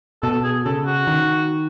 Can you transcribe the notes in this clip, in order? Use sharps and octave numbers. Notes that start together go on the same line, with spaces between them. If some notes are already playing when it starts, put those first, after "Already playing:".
B2 A4
G#4
C#3 A4
F#4
D#3